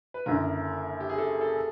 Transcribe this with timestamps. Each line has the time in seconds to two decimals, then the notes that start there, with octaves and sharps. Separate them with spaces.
0.14 B4
0.26 F#1 F#2 D3 A#4
1.00 G4
1.09 G#4
1.18 A4
1.41 A4